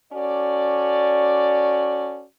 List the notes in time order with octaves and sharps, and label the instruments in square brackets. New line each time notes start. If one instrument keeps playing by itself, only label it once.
[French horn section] C#4 F#4 A4 D5